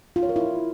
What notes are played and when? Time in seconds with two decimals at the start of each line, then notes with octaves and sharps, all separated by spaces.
0.16 F4
0.23 C#5
0.29 A#4
0.36 E4